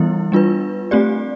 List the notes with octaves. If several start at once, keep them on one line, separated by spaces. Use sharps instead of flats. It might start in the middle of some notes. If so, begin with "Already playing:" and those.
Already playing: E3 G3 B3 E4
G3 D4 F4 B4
A3 C4 G4 D5